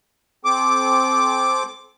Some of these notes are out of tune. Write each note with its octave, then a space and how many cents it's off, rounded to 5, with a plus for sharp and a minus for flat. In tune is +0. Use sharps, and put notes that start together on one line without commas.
C4 +0 A4 -40 D6 +0